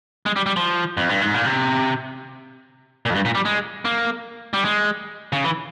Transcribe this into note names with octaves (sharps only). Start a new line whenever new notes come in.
G#3
G3
G3
F3
F2
G2
G#2
A#2
C3
A#2
F2
G2
A#2
G3
G#3
A#3
G3
G#3
C#3
E3